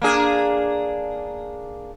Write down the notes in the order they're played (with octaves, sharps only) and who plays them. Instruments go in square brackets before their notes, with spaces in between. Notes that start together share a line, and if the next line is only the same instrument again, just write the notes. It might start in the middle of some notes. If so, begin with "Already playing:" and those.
[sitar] A#3 D4 G#4